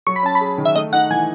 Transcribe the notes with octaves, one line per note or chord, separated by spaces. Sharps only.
F#3 C#6
B5
C#4 A5
B5
G#4
D#3
E5
A3 D#5
D#4 F#5
E3 G#5